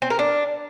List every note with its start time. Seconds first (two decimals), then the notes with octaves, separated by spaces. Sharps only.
0.02 C4
0.10 A#4
0.19 D4